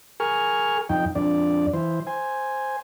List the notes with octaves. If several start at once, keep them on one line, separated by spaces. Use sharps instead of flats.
G#4 A#4 G#5 C#6 F6
F2 D#4 G5
F2 D4 D5
E3 C5
C5 G#5